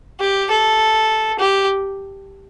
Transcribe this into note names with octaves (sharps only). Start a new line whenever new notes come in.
G4
A4
G4